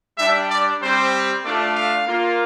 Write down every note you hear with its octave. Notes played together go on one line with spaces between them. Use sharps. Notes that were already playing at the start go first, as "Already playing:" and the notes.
G3 D4 G4 E5
D5
G3 C4 G4 C5
A3 D4 F4 D5
F5
A#3 F4